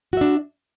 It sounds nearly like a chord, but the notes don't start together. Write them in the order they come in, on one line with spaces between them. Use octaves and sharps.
F#4 E5 D4